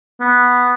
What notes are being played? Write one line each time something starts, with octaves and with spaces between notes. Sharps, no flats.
B3